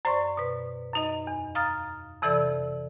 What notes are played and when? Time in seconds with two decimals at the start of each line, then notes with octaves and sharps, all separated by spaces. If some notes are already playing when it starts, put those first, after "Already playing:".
0.05 F#2 C5 D5 C6 C#6
0.37 B2 B4
0.94 F#2 D#4 D#5
1.27 E2
1.55 F5 A#5 D#6 F6 A6
2.22 F2 C3 E3 A4 D5 E6